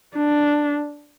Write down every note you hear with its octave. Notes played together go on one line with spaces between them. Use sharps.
D4